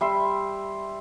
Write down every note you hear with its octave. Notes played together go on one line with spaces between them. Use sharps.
G3 E5 C6